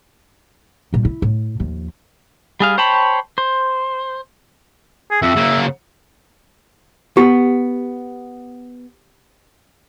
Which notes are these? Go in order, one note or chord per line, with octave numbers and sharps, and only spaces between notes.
A#2 G3
E4
A2
D#2 F3
G3 G#4 F5
C5 C#5 G5 A5 B5
C5
G#4
F2 E5
C#3 A#3
B3 G4